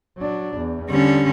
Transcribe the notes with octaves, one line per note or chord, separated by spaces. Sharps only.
F#3 D4
E2
D3 G3 C#4